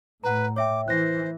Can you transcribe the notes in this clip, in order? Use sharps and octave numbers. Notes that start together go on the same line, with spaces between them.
A2 B4 F#5 A#5
C#5 E5 G5 D6
E3 C5 F#6 A#6